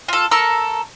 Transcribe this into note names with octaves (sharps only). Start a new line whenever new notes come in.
F4 A4
A4 A#4 C#6 E6